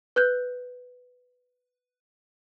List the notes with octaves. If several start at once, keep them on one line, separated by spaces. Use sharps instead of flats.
B4 F#6 G6